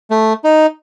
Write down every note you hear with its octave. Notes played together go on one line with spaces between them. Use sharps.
A3
D#4